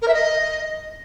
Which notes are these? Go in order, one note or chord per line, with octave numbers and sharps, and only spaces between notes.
A#4
E5
D#5